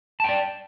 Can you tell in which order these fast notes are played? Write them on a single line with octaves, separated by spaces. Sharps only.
A5 G5 D5